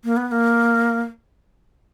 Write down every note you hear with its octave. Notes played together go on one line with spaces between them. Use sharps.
A#3
B3
B3
A#3